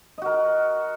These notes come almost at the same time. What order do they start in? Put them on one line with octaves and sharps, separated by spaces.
D#5 F#4 A#4